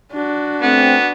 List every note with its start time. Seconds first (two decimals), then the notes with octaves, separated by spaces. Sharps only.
0.12 D4 F#4
0.62 A3 B3 C4